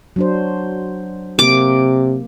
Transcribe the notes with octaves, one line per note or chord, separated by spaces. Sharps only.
F#3 D4 C5
C3 A#3 D6